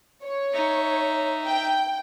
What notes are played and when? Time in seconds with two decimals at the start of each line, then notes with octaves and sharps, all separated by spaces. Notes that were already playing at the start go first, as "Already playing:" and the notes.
0.24 C#5
0.53 D#4 E5
1.47 G5